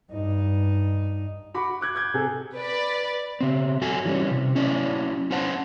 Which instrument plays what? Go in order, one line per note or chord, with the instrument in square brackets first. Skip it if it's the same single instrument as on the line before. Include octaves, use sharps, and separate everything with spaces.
[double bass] G2 D#4
[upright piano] F#4 B5 C#6 D6
D6 F#6 G#6
D6 G6 G#6
C3 G#4 A4
[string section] B4 D5
[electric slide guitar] C#3 C4
F#2 F#4 A4 G#5
E3 G3 C#4
C3
F#3 C#4 E4 D5
C#4 C5 F#5 A5